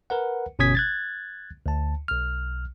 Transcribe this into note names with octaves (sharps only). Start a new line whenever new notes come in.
A#4 B4 F#5
G1 B2 C#4 D#6 G#6 B6
F#6 G#6 A6
D2 A5
B1 F6